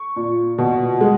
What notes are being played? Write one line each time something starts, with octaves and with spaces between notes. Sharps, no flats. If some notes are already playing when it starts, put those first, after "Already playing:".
Already playing: C#6
A#2
B2
G#3